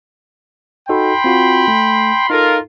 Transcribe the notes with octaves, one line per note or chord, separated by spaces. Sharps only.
D#4 F#4 A4 G5 B5 C6
C4 F4 F#4
A3
D#4 F4 A4 A#4